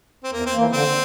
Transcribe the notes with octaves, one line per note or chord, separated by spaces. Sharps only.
C4
E2 A#3
C4
E3 A#3
D3 C4